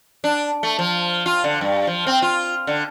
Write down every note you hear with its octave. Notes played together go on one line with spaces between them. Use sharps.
D4
A3
F3
F4
D3
G2
F3
C4
F4
D3